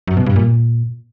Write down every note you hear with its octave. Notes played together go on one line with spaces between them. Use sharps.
F#2
B2
G2
A#2